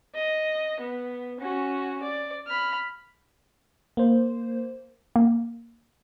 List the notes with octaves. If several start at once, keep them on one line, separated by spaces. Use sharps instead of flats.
D#5
B3
C#4 F#4
D5
B5 F6
A#3 C5
A#3